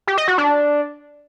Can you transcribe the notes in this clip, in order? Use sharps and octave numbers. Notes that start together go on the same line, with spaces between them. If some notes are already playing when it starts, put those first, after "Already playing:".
G4
D#5
F#4
D4